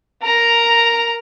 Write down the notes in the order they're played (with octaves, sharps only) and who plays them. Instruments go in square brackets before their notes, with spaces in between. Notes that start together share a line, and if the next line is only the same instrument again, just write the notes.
[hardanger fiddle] A#4 A#5